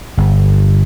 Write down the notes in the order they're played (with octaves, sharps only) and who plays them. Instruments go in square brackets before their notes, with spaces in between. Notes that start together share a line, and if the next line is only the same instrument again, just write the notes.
[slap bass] G1